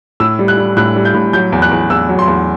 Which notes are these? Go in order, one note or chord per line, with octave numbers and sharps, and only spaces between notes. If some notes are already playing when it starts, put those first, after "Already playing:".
A2 E6
G3
F#6
G3
A2 F#6
G3
G6
A2
F#3 G6
E2
F#6
E2
E2 E6
F#3
C6
E2